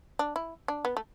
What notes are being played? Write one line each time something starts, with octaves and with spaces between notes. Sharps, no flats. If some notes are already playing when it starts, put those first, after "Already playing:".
D4
E4
D4
B3
A3